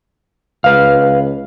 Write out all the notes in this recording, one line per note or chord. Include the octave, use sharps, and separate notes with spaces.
C#2 B4 F5